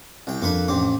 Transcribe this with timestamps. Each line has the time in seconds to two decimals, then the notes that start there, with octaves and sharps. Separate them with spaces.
0.27 C2 G5
0.42 F2 A#3 D4 A4 B4
0.68 A1 C4 D6